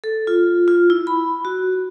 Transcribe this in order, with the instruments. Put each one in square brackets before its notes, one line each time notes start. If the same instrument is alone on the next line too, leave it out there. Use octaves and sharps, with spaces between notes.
[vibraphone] A4
F4
F4
E4
B5
F#4